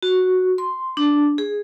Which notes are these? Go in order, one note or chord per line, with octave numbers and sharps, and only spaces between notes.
F#4
C6
D4
G#4